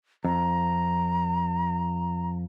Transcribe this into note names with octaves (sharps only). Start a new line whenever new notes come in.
F2 A#5